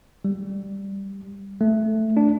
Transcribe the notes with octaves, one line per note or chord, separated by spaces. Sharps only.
G3
A3
D4